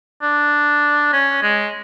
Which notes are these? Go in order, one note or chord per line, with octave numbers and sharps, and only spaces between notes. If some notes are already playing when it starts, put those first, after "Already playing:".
D4
C#4
G#3